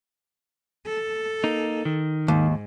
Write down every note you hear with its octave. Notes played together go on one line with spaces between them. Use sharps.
A4
A#3 D#4
D#3
D#2 G#2